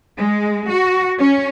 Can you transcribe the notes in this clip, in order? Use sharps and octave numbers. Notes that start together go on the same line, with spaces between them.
G#3
F#4
C#4